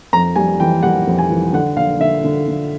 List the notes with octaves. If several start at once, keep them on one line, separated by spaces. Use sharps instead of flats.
F2 A#5
G3 G#5
E3 G5
G3 F#5
F2
G#5
E3
D3 F#5
D3 F5
D3 E5
D3
D3